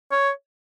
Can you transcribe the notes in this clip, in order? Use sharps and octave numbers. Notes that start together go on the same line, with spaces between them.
C#5